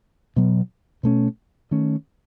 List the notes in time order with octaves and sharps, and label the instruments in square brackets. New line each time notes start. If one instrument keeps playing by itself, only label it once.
[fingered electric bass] B2 F#3 B3
B2 A3 C#4
D#3 A3 C#4